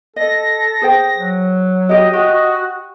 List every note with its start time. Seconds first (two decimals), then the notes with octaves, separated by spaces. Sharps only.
0.16 A4 D#5 A#6
0.82 G#4 C5 G5
1.18 F#3
1.89 F#4 G4 D#5
2.13 F#4 G4